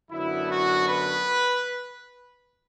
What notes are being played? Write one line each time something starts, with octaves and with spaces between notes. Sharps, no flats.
F#2 D3 F#3 B3 E4
F#4
B4